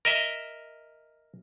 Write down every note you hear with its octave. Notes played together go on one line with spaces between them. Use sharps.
A#4 D#5 E5